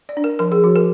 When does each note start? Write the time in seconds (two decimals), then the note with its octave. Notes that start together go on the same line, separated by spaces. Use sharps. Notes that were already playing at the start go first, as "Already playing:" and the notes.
0.09 D5
0.17 D4
0.24 A#4
0.39 F3 A#4
0.52 G#4
0.64 F3 F#4
0.76 A#4